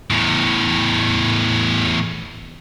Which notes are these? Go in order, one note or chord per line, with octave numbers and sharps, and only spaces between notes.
E2 A2